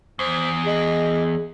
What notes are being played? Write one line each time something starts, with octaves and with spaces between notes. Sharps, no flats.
E2 C5
G#4 D#5